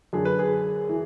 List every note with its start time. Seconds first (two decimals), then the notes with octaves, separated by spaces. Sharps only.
0.13 F#2 D3 G#4
0.25 B4
0.39 G#4
0.89 E3